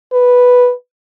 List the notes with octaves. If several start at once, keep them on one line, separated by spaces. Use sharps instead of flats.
B4